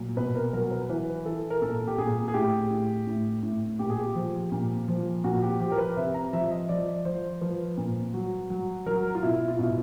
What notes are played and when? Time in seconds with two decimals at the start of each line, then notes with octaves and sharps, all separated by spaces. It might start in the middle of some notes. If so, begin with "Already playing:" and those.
Already playing: A#2 F#3
0.17 B2 B4
0.35 A#4
0.53 F#3 A#4
0.71 B4
0.89 E3 B4
1.26 E3 A4
1.50 A#4
1.62 A#2 A4
1.88 G4
1.98 A#2 G#4
2.28 G#4
2.34 A2 G4
2.71 A2
3.07 A2
3.43 A2
3.79 A#2 G4
3.90 G#4
4.00 G4
4.15 F3
4.52 A#2
4.88 F3
5.24 A#2 F#4
5.42 G4
5.60 F3 G4
5.72 A#4
5.78 B4
5.97 C3 E5
6.14 A#5
6.33 F3 E5
6.51 D#5
6.69 F3 D5
7.05 F3 C5
7.41 F3 B4
7.77 A#2
8.14 F#3
8.50 F#3
8.86 F#3 A#4
9.15 F4
9.23 B2 E4
9.48 F4
9.59 B2 E4